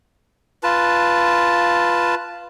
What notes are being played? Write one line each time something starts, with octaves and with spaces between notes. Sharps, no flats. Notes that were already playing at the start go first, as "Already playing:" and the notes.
F4 B4 A5